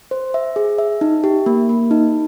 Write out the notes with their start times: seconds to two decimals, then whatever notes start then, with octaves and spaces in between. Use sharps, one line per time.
0.11 C5
0.34 E5
0.56 G#4
0.78 E5
1.01 D#4
1.24 G4
1.46 A#3
1.69 A#3
1.91 D#4